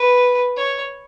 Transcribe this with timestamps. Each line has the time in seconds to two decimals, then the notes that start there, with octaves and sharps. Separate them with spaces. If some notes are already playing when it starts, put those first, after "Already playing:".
Already playing: B4
0.57 C#5